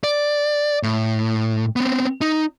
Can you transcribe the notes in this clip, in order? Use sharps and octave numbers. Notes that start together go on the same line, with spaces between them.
D5
A2
B3 C4
D#4